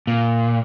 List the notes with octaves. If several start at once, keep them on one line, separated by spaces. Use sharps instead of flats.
A#2